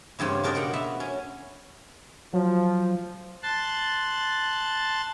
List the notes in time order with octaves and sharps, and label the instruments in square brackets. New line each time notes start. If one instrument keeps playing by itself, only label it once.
[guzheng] E2 G2 C#3 C4 C#5
C#3 D4 A#4 D5 D#5
B2 F#5 G5 A#5
B3 F#4 E5
C#4
[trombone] F3 [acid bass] F#3
[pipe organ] A5 C6 F#6 A6